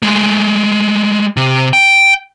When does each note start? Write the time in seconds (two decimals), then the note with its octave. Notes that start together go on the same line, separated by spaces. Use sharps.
0.02 G#3 A3
1.37 C3
1.73 G5